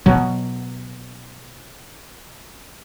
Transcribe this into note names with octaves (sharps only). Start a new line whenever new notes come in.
B2 F#3